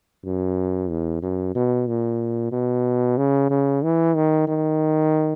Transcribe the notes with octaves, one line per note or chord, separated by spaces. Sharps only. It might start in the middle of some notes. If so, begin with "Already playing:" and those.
F#2
E2
F#2
B2
A#2
B2
C#3
C#3
E3
D#3
D#3